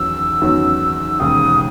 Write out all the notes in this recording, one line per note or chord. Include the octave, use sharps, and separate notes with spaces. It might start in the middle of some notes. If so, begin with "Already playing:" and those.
Already playing: E2 D#3 F#3 C#4 E6
E2 D#3 F#3 C#4
E1 D#2 C#3 D#6